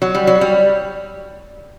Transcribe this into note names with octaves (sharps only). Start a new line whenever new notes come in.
F#3
G3
F#3
G3